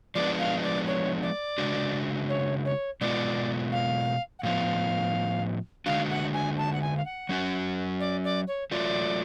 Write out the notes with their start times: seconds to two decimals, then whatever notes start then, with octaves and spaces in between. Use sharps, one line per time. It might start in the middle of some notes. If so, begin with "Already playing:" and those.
0.15 F3 G#3 B3 D4 D5
0.39 F5
0.63 D5
0.86 C#5
1.22 D5
1.58 C#3 G#3 D4 F#4
2.29 C#5
2.65 C#5
3.01 B2 G#3 B3 F4 D5
3.72 F5
4.39 F#5
4.43 A2 F3 B3 F5
5.86 D3 G#3 D4 F#4 F5
6.10 F#5
6.33 G#5
6.57 A5
6.73 F#5
6.82 G#5
6.97 F5
7.05 F#5
7.29 F#3 C#4 F#4
8.00 D5
8.24 D5
8.47 C#5
8.71 F#3 A3 F4 D5